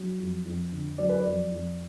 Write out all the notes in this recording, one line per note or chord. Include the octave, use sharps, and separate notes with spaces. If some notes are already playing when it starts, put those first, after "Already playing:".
Already playing: F#3
F2
F2
D3
F#3 D5
B4
D5
F2
F2